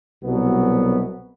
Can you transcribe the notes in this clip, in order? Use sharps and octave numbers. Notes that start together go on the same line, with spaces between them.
C2 B2 F#3 B3